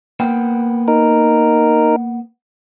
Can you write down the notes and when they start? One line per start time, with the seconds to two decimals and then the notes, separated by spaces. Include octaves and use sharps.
0.20 A#3 B3 G5
0.88 D#4 A#4